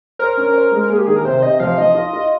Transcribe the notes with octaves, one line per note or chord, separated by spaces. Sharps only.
A#4 C5
C#4
C5
G#3
A#3 G#4
G4
D#3 G#4
A#4
C3 C5
C3 D#5
F3 F5
F3 D#5
F4
F4